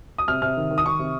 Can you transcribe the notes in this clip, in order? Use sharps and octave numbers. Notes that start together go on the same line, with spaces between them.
D#6
C3 F6
C3 F6
D#3
D#3
D#6
D#3 C#6
C3